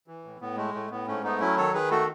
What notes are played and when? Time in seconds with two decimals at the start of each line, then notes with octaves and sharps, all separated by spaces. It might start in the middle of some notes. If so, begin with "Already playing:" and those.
0.08 E3
0.24 A2
0.40 A2 B3
0.57 G#3 A3
0.74 A2 A3
0.91 A2 B3
1.07 G#2 A3 C#4
1.24 A3 B3 D#4
1.40 F#3 C#4 E4
1.57 D#3 A4 C#5
1.73 D#3 G#4 B4
1.91 A3 F#4 A4